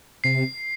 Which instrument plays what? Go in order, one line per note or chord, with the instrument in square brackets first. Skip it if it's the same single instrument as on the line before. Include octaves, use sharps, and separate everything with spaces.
[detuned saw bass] C3 [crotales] C7